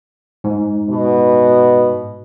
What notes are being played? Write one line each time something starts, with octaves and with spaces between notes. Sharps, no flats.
G#2
B2